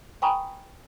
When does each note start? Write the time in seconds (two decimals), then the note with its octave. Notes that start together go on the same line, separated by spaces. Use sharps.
0.22 G5 G#5 A#5 B5 C#6 D#6